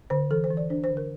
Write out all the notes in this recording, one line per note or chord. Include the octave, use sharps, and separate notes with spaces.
D3 C5
E3 A4
C5
E3
D5
D4 C5
C5
D3
A#4